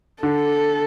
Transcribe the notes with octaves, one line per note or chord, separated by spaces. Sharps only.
D3 A4